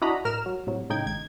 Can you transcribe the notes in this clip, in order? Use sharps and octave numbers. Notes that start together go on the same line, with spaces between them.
D4 E4 F#4 D#5 A#5 B5
A2 A#4 F6 E7
F#3
A2 C3 F#3
A2 C#3 D#4 G5 G#6
G#1 G#6